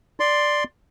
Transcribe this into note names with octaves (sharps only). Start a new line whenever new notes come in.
D5 C6